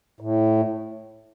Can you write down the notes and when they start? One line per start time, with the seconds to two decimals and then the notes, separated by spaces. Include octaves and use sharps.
0.20 A2